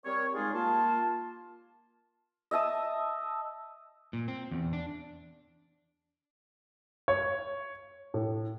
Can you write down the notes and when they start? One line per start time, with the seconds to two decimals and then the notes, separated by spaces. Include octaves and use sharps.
0.05 G3 C4 A#4 C#5
0.35 G3 G#3 D#4 F4 G#4
0.54 A#3 F4 A5
2.51 D#5 E5 A5 D#6
4.13 A#2
4.28 C4
4.51 E2
4.73 D4
7.08 C#5
8.14 A2